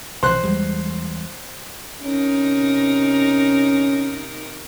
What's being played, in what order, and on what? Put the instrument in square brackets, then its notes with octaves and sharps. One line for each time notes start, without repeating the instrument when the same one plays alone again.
[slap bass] F1 B1 E3 [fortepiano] C5 F#6
[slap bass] E2 G3 G#3
[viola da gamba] C3 D#4 A#4 [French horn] C#4